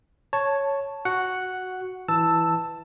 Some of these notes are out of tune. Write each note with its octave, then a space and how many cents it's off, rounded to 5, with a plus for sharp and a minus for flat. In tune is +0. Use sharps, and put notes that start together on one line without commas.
C#5 +0 A5 +0
F#4 +0 F#5 +0
E3 +0 A5 +10 E6 +0